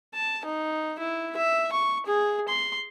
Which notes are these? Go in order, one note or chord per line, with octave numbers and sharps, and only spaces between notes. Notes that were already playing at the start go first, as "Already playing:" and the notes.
A5
D#4
E4
E5
C#6
G#4
C6